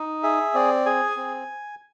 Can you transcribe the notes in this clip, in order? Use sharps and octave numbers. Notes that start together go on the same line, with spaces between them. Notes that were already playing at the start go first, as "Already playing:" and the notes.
Already playing: D#4
G#4 E5
C4 D5
G#4 G#5
C4